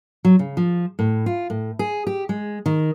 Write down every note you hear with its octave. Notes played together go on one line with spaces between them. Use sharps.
F#3
C#3
F3
A2
F4
A2
G#4
G4
G#3
D#3